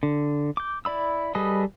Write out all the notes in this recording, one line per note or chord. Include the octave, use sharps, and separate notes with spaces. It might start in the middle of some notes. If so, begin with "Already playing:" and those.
D3
D6 G6
E4 D5 B5 E6
G3 G#4 A4 B4 D#5